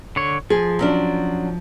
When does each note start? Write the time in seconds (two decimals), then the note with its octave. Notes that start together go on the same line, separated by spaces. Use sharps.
0.16 D3 C#5
0.50 F3 G#4
0.79 F#3 C#4 D4